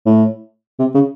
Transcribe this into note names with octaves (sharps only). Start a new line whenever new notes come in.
A2
C3
C#3